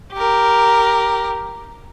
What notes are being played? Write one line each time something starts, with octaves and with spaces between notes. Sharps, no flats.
G4 A#4